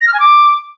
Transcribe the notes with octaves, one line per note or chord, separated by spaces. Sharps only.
A#6
F6
G#5
D6